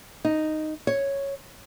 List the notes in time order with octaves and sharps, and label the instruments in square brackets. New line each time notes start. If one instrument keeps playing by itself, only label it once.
[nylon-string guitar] D#4
C#5